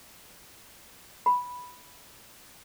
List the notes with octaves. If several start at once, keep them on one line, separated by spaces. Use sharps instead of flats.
B5